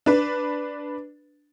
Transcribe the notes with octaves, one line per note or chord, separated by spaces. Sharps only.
D4 B4